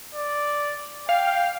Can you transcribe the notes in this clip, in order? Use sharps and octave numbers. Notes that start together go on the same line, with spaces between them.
D5
F5 G5